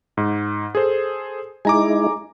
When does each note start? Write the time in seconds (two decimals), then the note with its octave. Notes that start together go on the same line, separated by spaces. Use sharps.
0.17 G#2
0.75 G#4 A4 C5
1.65 G#3 D#4 E4 G#5 A#5 D6